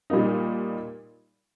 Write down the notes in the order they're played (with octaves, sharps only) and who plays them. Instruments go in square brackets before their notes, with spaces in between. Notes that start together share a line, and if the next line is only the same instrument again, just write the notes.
[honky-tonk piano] A#2 G3 A#3 D#4